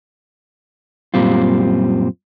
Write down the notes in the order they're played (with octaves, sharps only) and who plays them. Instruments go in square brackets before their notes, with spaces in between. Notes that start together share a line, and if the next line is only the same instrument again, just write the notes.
[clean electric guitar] F#2 A#2 G3 C4 F4